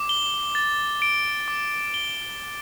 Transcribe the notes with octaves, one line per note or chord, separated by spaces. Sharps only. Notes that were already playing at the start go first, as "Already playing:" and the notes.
Already playing: D6
G7
A6
D7
D6
G7